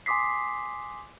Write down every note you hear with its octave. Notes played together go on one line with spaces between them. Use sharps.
G#5 C6 D6 D#6 B6 C7